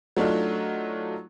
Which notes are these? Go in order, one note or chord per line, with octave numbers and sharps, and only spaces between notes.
F#3 A3 D4 D#4 F4